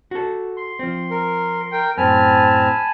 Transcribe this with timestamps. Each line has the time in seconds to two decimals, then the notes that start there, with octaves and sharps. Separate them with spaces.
0.11 F#4 A4
0.57 C6
0.79 F3 C4
1.11 A#4
1.72 A#4 G5
1.97 F#2 A2 C4 G#5 A5 B5 F6